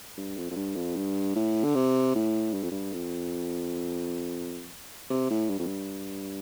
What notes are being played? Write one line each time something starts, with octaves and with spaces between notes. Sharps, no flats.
G2
F2
F2
G2
F2
G2
A2
D3
C3
A2
G2
F2
G2
F2
C3
A2
G2
F2
G2